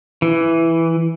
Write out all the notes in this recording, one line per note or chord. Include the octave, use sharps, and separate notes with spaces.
E3